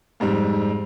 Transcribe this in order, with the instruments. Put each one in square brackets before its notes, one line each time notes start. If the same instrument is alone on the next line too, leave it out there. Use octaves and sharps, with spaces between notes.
[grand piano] F2 G#2 G3 C4